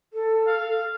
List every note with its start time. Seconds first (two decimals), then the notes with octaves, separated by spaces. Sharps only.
0.13 A4
0.47 F5